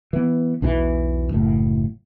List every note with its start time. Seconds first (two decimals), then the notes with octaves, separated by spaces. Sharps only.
0.13 E3 B3
0.62 B1 E2 B2 E3
1.33 F#1 A2